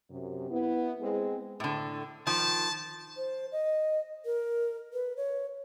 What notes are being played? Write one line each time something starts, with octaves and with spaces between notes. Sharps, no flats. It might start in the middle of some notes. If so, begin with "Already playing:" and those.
F#2 C3
B3 E4
G#3 C4 G#4
A2 D3
D#3 F3 A5
C5
D#5
A#4
B4
C#5